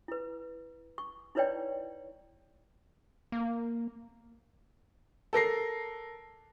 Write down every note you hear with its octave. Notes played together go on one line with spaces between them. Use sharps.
E4 B4
C#6
D#4 E4 B4 C#5 D5 G5
A#3
A4 A#4 A#6 C7